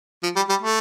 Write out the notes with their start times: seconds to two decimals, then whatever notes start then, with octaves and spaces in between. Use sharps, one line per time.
0.23 F3
0.36 G3
0.49 G3
0.62 A3